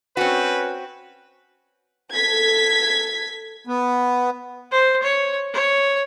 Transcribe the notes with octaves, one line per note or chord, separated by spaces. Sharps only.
C4 C#4 F#4 B4
A4 G#6 B6
B3
C5
C#5
C#5